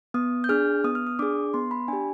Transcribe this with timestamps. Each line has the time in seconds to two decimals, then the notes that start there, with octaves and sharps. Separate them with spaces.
0.14 B3 D#6
0.44 G6
0.49 D4 G#4 F6
0.84 B3 D#6
0.95 F6
1.07 D#6
1.19 D4 G#4 D6
1.54 B3 C6
1.71 B5
1.88 D4 G#5
1.93 G4